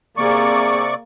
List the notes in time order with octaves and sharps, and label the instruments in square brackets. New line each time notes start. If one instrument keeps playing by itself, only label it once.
[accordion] C3 D5 C#6 [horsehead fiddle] A#3 G#4